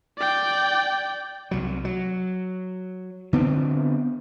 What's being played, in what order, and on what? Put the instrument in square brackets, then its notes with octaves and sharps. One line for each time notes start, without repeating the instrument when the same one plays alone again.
[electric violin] D5 G5
[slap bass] C2 F#3
F#3
D3 B3 C4